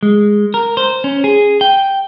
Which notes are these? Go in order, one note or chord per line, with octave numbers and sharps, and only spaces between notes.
G#3
A#4
C5
C#4
G#4
G5